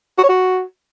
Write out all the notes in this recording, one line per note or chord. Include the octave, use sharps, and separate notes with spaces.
F#4
C#5
F#4